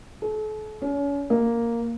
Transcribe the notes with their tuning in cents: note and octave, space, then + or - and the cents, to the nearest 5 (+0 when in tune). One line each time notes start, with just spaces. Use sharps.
A4 -40
C#4 +35
A#3 +0